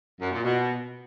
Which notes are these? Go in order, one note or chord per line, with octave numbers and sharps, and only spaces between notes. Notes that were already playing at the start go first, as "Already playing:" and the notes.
F#2
A#2
B2